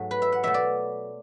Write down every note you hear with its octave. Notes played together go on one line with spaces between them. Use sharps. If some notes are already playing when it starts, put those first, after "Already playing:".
Already playing: G#2 F#3 A3
B4
E5
F#5
B2 F#3 A3 E5
D5